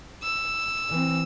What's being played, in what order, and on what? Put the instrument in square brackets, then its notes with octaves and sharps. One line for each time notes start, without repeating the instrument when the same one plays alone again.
[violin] E6
[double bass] E3 C4